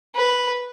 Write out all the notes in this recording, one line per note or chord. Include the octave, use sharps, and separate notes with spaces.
B4